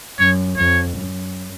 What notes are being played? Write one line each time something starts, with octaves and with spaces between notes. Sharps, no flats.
F#2 C#5
F2 C#5
F#2